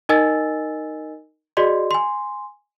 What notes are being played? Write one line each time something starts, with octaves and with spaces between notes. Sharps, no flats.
D#4 A#4 D#5 G#5 E6 A6
F#4 G#4 D5 D#5 C6
G#5 C6